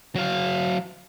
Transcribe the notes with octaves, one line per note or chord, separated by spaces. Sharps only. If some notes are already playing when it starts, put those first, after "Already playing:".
F#3 F5